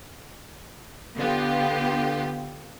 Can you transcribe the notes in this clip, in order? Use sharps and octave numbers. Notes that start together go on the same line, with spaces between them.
D3 B3 F4 G4